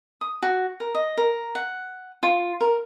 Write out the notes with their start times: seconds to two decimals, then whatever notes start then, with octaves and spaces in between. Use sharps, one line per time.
0.21 D#6
0.42 F#4
0.80 A#4
0.95 D#5
1.17 A#4
1.55 F#5
2.23 F4
2.61 A#4